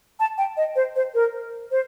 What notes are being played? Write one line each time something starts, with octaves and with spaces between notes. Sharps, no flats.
A5
G5
D#5
C5
C5
A#4
C5